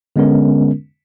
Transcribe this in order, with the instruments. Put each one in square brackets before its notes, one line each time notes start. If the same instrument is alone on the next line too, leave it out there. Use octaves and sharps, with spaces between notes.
[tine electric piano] D3 G#3 B3 C#4 A#4